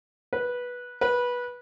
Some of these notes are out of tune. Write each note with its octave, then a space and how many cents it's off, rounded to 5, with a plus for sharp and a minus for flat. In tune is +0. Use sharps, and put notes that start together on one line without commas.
B4 -10
B4 -15